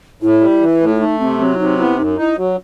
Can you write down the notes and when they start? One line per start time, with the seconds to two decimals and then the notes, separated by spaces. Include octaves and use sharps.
0.22 A2 E4
0.41 G3
0.61 E3
0.81 A2
0.95 E4
1.00 A3 D#4
1.20 C3 C4
1.39 F#3 C4
1.55 E4
1.59 C3 D#4
1.79 B3 E4
1.98 F#2 D#4
2.18 D#4 E4
2.38 F#3 F#4